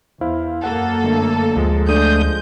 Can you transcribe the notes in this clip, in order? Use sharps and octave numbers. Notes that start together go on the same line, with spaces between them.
E2 E4 C5 F5
F#2 A#3 A4 F#5
G1 D3 A3
D2 F3 G#3
A3 D4 D#6 G6